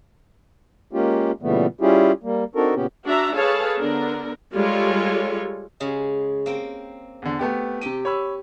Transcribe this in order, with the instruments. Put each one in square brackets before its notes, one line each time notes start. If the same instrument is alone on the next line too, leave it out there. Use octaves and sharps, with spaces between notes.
[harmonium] G#3 A#3 C#4 F4 G4
A#2 C#3 E3 G3 A3 B3
G3 C#4 E4 F4 G4 G#4
G3 A#3
C4 D4 D#4 F#4 A4 A#4
A#2 C#3 B3 C#4 G4
[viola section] D4 F#4 E5 A#5
G#4 A4 B4 C#5 F5 A5
D3 B3 D4 A#4
G3 G#3 F4 A4 C#5
[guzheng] C#3 G#3
A#3 C4 G5
[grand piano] E2 D3
A3 B3 G4
[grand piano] C3 D#7 [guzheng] G4 G5
[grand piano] C#5 B5 E6